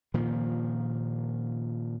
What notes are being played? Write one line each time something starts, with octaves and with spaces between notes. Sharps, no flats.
A#2 D#3 F3